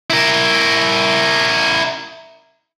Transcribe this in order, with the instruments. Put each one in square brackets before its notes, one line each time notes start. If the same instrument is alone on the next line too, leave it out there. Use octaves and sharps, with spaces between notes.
[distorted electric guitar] E4 A#4